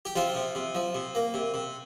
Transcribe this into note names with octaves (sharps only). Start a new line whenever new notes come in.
G4
C3 F3 F4
C3
C3
F3
C3
A#3
C3
C3